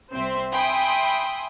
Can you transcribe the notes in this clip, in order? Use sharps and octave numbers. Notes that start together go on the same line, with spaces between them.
C2 C4 C5 E5
E5 G5 G#5 B5 C6 D#6